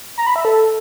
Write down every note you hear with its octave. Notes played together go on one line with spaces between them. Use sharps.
A#5
B5
E5
A4